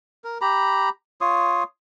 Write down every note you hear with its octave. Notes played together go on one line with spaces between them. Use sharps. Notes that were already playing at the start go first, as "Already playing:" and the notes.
A#4
G4 A#5 B5
F4 C#5 C6 D#6